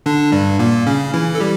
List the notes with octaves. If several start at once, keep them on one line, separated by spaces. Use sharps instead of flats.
D3 D4
G2 G3
A#2 A#3
C#3 C#4
E3 E4
A4
G3 G4